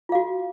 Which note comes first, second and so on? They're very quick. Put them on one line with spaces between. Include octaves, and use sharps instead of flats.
F4 F5 F#4